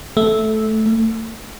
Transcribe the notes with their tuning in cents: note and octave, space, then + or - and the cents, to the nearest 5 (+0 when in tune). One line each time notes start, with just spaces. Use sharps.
A3 -10
A3 +35